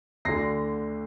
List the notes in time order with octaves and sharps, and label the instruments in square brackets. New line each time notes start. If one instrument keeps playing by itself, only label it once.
[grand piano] D2 D3 A#6 C7